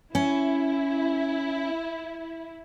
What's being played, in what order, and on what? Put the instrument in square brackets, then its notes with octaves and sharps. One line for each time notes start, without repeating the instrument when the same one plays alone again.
[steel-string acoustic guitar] C#4 [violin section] E4